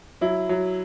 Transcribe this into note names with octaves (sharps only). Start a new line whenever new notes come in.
F#3 E4
F#3